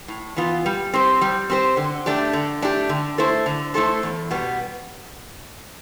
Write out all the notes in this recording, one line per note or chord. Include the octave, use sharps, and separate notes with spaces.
A2
E3 B3 F4
G3
C4 G4 C5
G3
C4 G4 C5
D3
A3 D4 G4
D3
A3 D4 G4
D3
A3 E4 A4 C5
D3
A3 E4 A4 C5
E2
B2 G3 B3